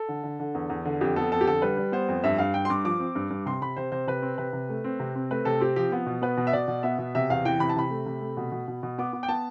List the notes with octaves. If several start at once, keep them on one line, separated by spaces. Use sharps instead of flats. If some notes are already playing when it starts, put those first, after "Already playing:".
Already playing: A4
D3
D3
D3
E2
E2
D3
F2 G4
B3 A4
F2 A4
G4
D3 A4
G3 B4
G3
B3 C5
F2
G2 E5
G2 F5
G2 G5
C6
G2 D6
F3 D6
C4
G2
G2
C3 C6
C3 B5
C3 C5
C3 C5
C3 B4
C4
C3 B4
C3
A3
C4
C3
C4
A3 B4
C3 A4
C4 G4
F3 G4
B3
B2
B3 B4
B2
E5
B2 D5
B2
B3 E5
B2
C3 E5
E2 F5
E3 G5
C3 B5
A5
C3 B5
A3
C3
A3
B2
B2
B2
B2
B3 D6
B3
G5
B3 A5